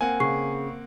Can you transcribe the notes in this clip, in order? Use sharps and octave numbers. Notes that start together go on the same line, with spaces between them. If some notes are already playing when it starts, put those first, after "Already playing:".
A#3 C4 F#5 G#5
C#3 C#6 C7